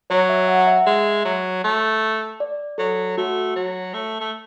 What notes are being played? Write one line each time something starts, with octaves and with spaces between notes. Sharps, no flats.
F#3 C#5
E5
F#5
E5
G#3 E5
F#3
A3
D5
F#3 A4
A3 F#4
F#3
A3
A3